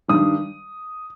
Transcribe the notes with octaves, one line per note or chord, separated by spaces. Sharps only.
G2 D#3 D#6